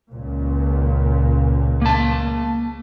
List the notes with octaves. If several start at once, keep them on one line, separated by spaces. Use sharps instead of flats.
C#2 A#2
A#3 A5